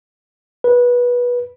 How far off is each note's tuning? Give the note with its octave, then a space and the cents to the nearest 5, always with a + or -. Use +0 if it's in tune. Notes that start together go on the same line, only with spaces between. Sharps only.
B4 -20